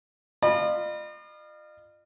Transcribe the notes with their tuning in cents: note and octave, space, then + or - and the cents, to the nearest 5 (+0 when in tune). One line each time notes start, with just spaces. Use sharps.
F4 -10 D#5 -45 B5 -20